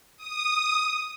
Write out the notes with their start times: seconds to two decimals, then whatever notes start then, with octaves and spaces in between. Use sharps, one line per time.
0.16 D#6